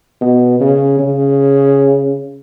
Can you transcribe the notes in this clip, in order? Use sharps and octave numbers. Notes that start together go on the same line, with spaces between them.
B2
C#3
C#3